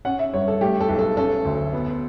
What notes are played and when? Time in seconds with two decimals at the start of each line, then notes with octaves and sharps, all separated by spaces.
0.05 C#4 F#5
0.19 E5
0.34 G2 C#5
0.48 A4
0.61 A3 G4
0.81 A4
0.89 B1
0.99 A4
1.17 C#4 A4
1.45 D2
1.73 B3